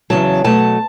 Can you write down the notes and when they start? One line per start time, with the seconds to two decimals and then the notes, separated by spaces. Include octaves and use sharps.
0.10 E2 C#3 F#3 A5
0.44 B2 F#3 A3 A5